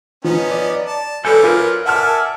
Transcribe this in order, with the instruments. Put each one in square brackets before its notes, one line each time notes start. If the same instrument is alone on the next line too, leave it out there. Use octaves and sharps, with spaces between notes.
[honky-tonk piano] F3 [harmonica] B3 C#4 D#4
[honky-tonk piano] D5
[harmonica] A5
[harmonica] F#3 B4 D5 [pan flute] A4 [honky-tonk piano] G#5 G6
[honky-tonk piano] F4 [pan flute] A#4
[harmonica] D5 E5 G#5 [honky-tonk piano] F#5 A5 F6